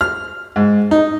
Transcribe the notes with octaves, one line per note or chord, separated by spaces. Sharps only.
F6
G#2
D#4